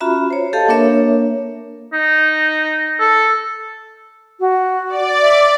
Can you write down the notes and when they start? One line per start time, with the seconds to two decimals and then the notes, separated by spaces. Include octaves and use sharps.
0.01 C#4 F4 F#4 E5 A#5 B5
0.30 C5 C#5
0.53 G4 A4 D#5 F5 A5
0.68 A#3 D4 A#4 C#5 E5
1.93 D#4
3.00 A4
4.40 F#4
4.89 D5
5.22 E5